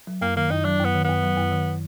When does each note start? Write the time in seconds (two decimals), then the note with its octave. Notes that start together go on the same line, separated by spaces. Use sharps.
0.07 F#3
0.21 F#2 A#3
0.36 D#3 A#3
0.51 F#2 D#4
0.65 F#3 D4
0.80 F#2 B3
0.95 D#3
1.04 F#2 B3
1.23 F#3
1.37 F#2
1.52 D#3